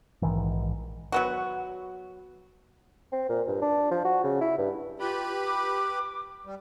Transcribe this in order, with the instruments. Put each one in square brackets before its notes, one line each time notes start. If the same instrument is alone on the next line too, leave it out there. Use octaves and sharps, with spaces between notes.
[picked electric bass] A#1 G#2 D#3 E3
[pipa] F#3 B3 F#4
[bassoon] C4
A#2
G2
D4
F3
F#4
C#3
E4
G2
[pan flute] F4 [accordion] G4 B4 B5
[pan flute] D6
[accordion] G3